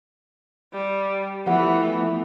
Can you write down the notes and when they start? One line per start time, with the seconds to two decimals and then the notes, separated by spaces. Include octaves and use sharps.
0.73 G3
1.47 E3 F3 A3 B3 G4 F#5